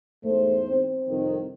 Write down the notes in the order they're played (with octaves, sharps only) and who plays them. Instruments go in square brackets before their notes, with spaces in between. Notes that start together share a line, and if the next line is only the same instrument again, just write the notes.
[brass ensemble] E2 G#2 C5 [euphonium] A3
[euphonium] C4
[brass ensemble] C2 F2 D#3